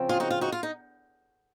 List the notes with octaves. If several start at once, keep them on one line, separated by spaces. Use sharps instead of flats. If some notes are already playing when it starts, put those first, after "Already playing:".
Already playing: C#3 F3 C4
F4 G#4
D#4 F#4
F4
D#4 F#4
F4
D#4